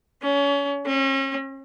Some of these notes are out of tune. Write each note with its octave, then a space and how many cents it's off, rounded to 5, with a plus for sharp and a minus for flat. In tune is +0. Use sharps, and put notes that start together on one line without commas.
C#4 +30
C#4 -40